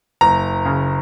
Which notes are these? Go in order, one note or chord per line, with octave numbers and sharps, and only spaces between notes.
F#1 A#5
C#3